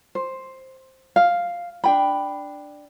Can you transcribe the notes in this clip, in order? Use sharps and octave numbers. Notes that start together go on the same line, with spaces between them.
C5
F5
D4 G5 B5